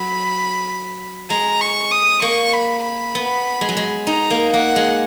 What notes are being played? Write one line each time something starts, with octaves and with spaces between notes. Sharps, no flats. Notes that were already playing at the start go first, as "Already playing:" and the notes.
Already playing: F#3 B5
G#3 A#5
C#6
D#6
A#3 C#6
B5
B5
B3
G#3
F#3
G#3
D#4 A#5
A#3
A#3 F#5
G#3